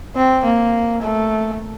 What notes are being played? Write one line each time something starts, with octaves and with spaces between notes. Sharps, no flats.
C4
A#3
A3